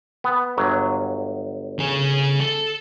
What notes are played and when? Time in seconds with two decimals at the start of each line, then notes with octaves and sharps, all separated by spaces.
0.24 B3
0.58 G1 F#3
1.79 C#3 G#4
2.40 A4